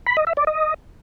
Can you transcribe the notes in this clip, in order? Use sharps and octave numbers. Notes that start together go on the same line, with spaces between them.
B5
D#5
E5
D5
D#5